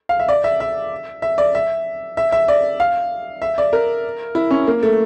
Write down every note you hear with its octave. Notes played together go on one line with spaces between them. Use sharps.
F5
E5
D5
E5
E5
E5
D5
E5
E5
E5
D5
F5
E5
D5
A#4
E4
C#4
A#3
A3